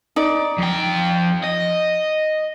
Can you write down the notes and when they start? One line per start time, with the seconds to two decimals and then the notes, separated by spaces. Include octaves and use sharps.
0.16 D#4 D5
0.58 F2 G5
1.44 D#5